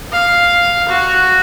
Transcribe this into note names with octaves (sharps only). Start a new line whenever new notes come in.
F5
F#4